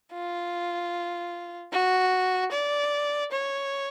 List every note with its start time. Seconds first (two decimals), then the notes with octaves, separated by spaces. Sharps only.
0.13 F4
1.72 F#4
2.52 D5
3.31 C#5